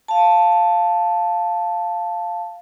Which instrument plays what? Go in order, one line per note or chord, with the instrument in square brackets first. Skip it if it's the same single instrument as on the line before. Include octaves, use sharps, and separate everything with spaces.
[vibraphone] F5 A5